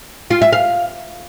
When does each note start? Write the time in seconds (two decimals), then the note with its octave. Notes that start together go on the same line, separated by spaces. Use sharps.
0.30 F4
0.41 E5
0.53 F5